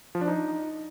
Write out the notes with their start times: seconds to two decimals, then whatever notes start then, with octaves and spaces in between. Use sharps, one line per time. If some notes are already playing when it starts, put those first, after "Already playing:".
0.15 F3
0.21 D4
0.28 D#4